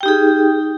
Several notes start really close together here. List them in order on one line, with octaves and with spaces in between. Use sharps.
G5 G4 D#4 G#4